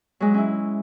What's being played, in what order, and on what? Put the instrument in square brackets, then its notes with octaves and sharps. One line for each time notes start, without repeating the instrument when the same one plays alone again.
[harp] F#3 G#3
C#4 E4